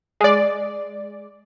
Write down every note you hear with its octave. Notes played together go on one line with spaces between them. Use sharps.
G#3 D5